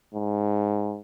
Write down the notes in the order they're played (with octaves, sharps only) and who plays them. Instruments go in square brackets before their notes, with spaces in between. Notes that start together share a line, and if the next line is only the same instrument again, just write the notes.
[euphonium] G#2